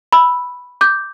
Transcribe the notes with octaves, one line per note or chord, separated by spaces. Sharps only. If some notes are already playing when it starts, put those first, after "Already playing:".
B5 E6
D6 G6